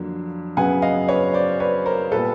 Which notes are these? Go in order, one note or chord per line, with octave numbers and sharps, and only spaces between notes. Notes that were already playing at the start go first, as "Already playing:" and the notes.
Already playing: F2 D3 F#3 A#3
F#2 C#3 F#3 B3 F#5 G#5
D#5 F5
B4 C#5
C5 D5
B4 C#5
A#4 C5
A#2 G3 B3 A4 B4